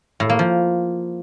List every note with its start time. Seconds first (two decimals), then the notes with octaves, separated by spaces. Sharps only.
0.20 A2
0.30 A#3
0.39 F3